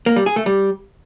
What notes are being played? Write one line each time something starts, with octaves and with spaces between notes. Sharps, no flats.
A#3
G3
G#4
A3
G3